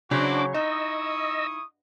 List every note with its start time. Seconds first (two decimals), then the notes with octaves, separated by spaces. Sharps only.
0.11 C#3 F#3 C#4 D4 E4 F#4 C5 D6
0.54 D#4 E4 D#5 C#6 D#6 E6